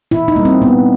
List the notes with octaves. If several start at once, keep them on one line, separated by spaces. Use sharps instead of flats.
A#2 E4
D#4
G3 A#3
C4
A#2 B3